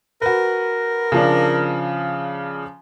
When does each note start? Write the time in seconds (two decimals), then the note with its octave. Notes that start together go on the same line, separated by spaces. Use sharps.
0.22 F#4 A#4 B4
1.12 C#3 F3 D4